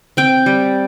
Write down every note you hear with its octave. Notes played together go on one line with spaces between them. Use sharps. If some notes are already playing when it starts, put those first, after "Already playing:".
C4 G5
G3